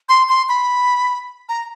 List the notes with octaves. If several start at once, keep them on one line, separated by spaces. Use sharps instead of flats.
C6
C6
B5
A#5